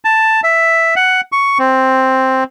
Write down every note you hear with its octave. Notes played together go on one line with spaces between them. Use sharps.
A5
E5
F#5
C#6
C4